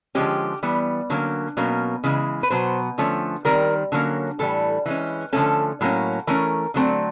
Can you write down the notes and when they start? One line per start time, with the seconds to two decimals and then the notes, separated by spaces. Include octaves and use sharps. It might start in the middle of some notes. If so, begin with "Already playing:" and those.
0.15 D3 F3 G#3 C#4 G4
0.63 E3 G3 B3
1.10 D3 F#3 A#3 C#4
1.57 B2 F#3 A#3 C#4
2.04 C#3 E3 G#3
2.43 B4
2.50 B2 F#3 B3 C5
2.98 D3 F3 A3 C#4
3.45 D#3 G3 C4 A#4
3.92 D3 F#3 A#3 C#4
4.39 A2 E3 G3 A4
4.86 E3 G#3 C#4
5.33 D3 F3 A3 C#4 A4
5.81 A2 F#3 A#3 C#4
6.27 E3 A3 C#4 A#4
6.74 D3 F#3 A3 C4